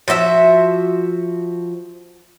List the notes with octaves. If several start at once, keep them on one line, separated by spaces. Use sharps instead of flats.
F3 F#4 D#5 E5